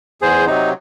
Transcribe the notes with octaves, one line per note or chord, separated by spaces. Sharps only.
E2 G#4 C5
C3 F#3 D#4